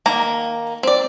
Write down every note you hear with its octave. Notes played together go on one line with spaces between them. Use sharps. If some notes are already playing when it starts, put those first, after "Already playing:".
D#3 A#3 A#5
C4 D5